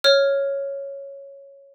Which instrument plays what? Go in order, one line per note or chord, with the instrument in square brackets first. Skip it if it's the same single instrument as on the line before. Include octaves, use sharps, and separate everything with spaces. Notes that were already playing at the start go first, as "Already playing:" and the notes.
[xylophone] C#5 F6